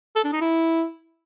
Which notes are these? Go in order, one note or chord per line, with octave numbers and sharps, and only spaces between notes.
A4
D4
D#4
E4